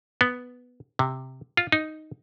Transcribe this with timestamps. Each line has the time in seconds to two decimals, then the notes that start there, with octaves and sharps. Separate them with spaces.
0.21 B3
0.99 C3
1.57 F4
1.72 D#4